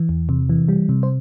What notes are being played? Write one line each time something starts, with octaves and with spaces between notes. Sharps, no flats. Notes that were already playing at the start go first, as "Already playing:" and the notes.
Already playing: E3
E2
C3
E3
G3
C3
C5